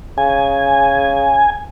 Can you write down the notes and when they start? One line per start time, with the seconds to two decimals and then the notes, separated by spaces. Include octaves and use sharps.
0.18 C#3 G#5